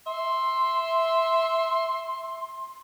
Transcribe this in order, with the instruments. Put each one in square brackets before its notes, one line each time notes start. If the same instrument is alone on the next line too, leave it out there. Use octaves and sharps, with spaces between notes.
[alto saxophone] E5 [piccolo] C6